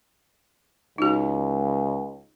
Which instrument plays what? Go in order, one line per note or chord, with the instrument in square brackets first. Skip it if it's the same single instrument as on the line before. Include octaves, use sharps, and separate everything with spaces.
[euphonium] C#2 [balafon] D#4 F#4